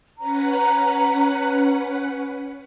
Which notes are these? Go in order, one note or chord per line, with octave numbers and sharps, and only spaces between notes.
C#4 B4 F#5 A#5